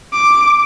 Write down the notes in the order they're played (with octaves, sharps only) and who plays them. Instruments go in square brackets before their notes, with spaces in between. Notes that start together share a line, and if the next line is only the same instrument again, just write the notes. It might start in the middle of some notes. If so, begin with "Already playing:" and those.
[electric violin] D6